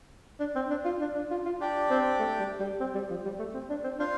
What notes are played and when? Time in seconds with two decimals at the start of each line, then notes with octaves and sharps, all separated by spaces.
0.40 D4
0.55 C4
0.70 D4
0.84 F4
1.00 D4
1.15 D4
1.31 F4
1.45 F4
1.60 D4 G4 D5 G5
1.90 C4
2.19 A3
2.39 G3
2.60 G3
2.80 C4
2.94 G3
3.10 F3
3.25 G3
3.39 A3
3.54 C4
3.70 D4
3.84 C4
3.99 D4 F4 C5 F5